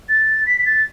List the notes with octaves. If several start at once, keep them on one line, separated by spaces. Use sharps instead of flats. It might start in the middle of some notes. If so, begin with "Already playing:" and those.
A6
B6
B6
A6